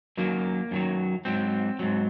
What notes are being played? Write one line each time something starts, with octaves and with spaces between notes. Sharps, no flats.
F#2 D#3 F#3 A#3
F#2 D#3 F#3
G#2 F#3 C4
G#2 F#3